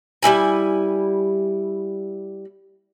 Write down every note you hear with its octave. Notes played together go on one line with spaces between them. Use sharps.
G3 A#3 E4 G#5